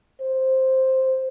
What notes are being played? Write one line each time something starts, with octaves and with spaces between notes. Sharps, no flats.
C5